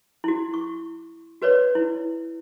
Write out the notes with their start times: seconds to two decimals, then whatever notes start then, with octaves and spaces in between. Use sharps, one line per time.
0.24 E4 F#4
0.54 C#6
1.42 F#4 B4 C#5 D5
1.75 E4